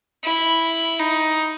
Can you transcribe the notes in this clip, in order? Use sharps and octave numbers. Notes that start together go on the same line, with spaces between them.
E4
D#4